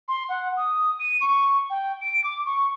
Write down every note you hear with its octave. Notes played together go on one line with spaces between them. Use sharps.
C6
F#5
D#6
D#7
C#6
G5
D7
D6
C#6